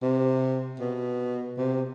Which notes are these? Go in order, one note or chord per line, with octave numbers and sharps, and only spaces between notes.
C3
B2
C3